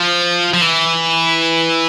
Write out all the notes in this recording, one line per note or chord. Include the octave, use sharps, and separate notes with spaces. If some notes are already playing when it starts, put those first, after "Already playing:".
Already playing: F3
F3
E3